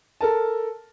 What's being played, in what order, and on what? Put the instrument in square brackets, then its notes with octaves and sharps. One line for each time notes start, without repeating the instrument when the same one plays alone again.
[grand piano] A4 A#4 A5